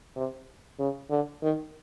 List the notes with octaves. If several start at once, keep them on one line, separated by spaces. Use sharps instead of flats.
C3
C#3
D3
D#3